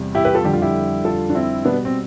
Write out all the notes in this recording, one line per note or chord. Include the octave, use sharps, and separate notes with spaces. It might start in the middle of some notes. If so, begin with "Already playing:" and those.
Already playing: E2 C3 G3
E4 G4
G4 B4
F4 A4
F2 D3 G3 G4
F4
E4 G4
F4 A4
D4
C4 E4
B2 G3 B3 D4
C4